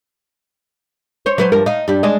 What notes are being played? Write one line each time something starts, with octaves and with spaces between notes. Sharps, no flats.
C5 C#5
F#3 B4 C5
G2 F3 A#4
D#4 F5
G2 G3
G#3 D4 D#5